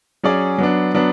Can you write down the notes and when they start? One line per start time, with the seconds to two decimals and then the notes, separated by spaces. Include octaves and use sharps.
0.24 F#3 C#4 G#4 D5
0.58 F#3 B3 D4
0.94 F#3 B3 D4